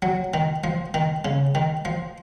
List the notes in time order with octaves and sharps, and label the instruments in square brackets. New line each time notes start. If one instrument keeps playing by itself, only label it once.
[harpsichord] F#3
D#3
F3
D#3
C#3
D#3
F3